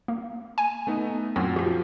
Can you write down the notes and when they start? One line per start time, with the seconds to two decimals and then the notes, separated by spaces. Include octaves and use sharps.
0.08 A#3
0.58 G#5
0.87 A3 B3 D#4
1.36 F#2 A#2 C4 C#4 F#5
1.56 F3 F#4 G4